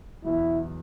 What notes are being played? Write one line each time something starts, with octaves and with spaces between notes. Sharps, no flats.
E2 B2 F#3 E4